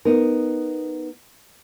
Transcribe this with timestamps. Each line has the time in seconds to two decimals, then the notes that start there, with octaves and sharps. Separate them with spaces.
0.05 B3 D#4 A#4